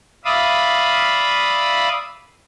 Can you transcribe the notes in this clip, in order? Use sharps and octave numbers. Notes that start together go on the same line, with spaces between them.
D5 E5 F5 B5 D#6